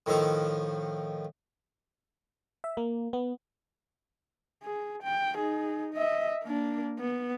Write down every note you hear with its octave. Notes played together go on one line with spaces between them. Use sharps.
A2 D#3 F3 A4
E5
A#3
B3
G#4
G5
D#4 G#4
D#5 E5
A#3 D4
B3